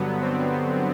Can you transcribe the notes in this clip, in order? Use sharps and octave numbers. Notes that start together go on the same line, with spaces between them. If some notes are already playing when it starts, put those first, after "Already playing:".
Already playing: G2 D3 F#3 B3
C4